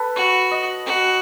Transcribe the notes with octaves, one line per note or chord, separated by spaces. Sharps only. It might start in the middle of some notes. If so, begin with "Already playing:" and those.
Already playing: A4 B4
F#4 C#5
D#5
F#4